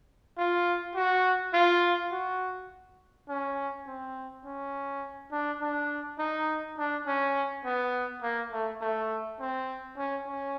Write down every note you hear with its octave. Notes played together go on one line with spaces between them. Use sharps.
F4
F#4
F4
F#4
C#4
C4
C#4
D4
D4
D#4
D4
C#4
B3
A#3
A3
A3
C4
C#4
C#4